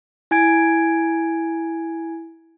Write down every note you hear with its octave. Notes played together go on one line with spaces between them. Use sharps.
E4 G#5 G#6 D7